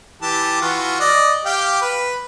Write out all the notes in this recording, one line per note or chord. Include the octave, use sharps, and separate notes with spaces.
E3 G4 A5
E3 F4 F#4
D5 D#5
G4 F5 G5
B4